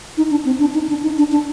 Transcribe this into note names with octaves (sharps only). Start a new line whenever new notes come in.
D#4
D4
C4
D4
D#4
D4
D#4
D4
D4